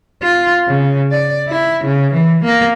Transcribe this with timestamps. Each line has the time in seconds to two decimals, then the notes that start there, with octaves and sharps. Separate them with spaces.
0.22 F4
0.67 C#3
1.11 D5
1.48 E4
1.84 C#3
2.13 E3
2.44 A#3